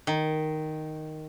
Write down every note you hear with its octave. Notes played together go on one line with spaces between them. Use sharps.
D#3